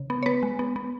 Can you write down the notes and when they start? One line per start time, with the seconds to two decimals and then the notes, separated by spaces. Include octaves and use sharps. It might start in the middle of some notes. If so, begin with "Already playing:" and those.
Already playing: C#3
0.10 B3
0.23 C#5
0.26 B3 B4
0.43 G#3
0.59 B3
0.76 B3